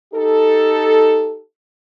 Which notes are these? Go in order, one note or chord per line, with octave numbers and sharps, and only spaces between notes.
D#4 G4 A4